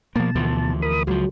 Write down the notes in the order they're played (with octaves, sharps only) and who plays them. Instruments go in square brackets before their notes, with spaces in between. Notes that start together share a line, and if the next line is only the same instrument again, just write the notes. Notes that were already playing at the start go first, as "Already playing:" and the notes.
[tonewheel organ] B2 A5 [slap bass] F3 A#3
[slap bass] D2 E3 F3
[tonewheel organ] A#4 B5 D#6
[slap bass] C#2 F3 [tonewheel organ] F#3